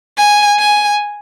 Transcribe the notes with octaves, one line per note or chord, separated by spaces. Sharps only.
G#5
G#5